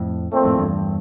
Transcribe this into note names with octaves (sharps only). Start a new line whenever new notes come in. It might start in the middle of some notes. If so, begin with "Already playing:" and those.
Already playing: F2 A2
A#2 A3 C4
F2 A2
E2 G2